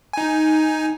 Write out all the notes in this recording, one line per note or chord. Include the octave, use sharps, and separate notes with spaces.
D#4 G#5